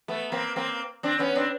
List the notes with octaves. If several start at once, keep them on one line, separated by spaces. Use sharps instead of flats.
A3 B3
A#3 C4
A#3 C4
C4 D4
B3 C#4
C4 D4